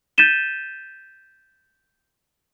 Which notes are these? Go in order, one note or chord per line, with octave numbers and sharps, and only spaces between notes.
G6 A6 B6 D#7 E7 G7